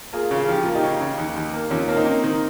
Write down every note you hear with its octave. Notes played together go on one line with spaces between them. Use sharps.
A#3 F4 G#4
C#3
G#4
F3 G4
A#3 F4
D#4 G4
C#3
C#3
D#2
D#2
A#3
D#2 C#4 F4
A#3 C#4
C4 D#4
A#3
D#3